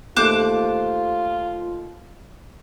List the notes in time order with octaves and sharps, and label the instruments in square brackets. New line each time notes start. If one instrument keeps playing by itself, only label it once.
[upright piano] D#2 A3 [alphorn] F4 [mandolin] C5 D6 F#6